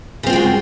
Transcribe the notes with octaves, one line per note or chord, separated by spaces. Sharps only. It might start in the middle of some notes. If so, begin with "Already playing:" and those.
C#3 G#3 C4 F4 F#4